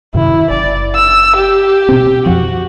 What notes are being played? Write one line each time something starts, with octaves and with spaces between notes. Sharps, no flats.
F#2 C3 D#3 E4
F#1 D5
E6
G4
B2 C4
F2 F3 F#4